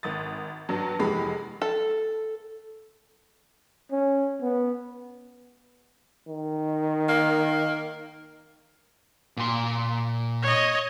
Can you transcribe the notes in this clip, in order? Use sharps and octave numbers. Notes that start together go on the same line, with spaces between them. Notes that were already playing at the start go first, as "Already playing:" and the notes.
G#1 D#6 A6
G2 F#3
F1 E2 G#3 G4 B5
A4
C#4
B3
D#3
A#3
A#2 C6
C#5 D#5